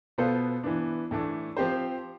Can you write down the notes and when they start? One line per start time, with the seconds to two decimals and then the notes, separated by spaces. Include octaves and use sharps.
0.18 B2 B3 F4 A4 C5
0.64 E3 B3 D4
1.11 A2 E3 A3 D4
1.57 F3 C4 G4 C5